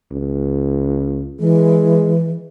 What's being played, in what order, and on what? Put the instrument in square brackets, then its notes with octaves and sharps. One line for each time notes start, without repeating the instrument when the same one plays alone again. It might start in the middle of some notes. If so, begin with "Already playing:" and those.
[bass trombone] C#2
[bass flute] E3 [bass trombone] G#3